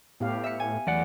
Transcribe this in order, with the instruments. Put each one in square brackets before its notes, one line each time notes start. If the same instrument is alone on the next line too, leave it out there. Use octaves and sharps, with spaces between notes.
[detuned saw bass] A2 [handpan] B3 G4 F5
[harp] E5 C#7
G#5
[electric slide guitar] E2 D5 F#5 [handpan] F#3 A3